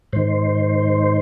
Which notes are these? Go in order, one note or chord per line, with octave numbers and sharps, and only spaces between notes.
G#2 D#3 C5